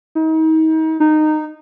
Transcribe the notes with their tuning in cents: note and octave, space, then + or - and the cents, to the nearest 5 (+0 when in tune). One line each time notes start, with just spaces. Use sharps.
D#4 +35
D#4 -15